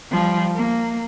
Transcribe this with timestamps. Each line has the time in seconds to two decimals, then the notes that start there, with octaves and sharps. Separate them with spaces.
0.11 F3 G3
0.55 A#3